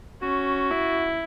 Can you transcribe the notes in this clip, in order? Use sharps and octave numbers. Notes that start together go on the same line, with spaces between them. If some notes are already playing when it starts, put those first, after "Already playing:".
C#4 F#4
E4